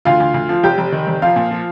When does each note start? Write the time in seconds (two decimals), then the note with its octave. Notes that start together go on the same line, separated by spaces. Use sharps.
0.05 D2 F4 F5
0.20 D2
0.34 D2
0.49 F3
0.63 F1 G4 G5
0.78 F1
0.92 D#3
1.07 F1
1.22 F3 F4 F5
1.36 A#2
1.51 F3